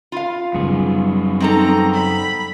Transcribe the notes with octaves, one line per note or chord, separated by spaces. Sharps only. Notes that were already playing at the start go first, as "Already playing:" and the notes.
F4 F5
F#2 C#3 G3 B3 G#4
C4 D#4 A4 A#5
B5